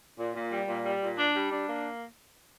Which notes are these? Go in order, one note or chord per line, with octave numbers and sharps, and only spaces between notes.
A#2
A#2
G3
A#2
G3
A#2
D4
G3
D4
A#3